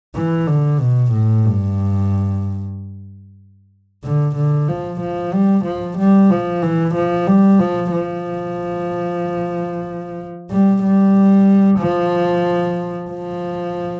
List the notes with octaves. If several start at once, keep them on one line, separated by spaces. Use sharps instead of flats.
E3
D3
B2
A2
G2
D3
D3
F3
F3
G3
F3
G3
F3
E3
F3
G3
F3
F3
G3
G3
F3
F3